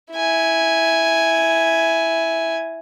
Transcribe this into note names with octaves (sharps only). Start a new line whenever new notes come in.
E4 G#5